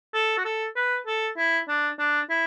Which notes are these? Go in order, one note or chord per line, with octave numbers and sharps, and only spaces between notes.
A4
F#4
A4
B4
A4
E4
D4
D4
E4